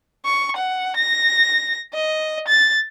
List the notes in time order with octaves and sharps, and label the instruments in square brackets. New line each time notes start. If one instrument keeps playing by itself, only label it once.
[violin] C#6
F#5
A#6
D#5
A6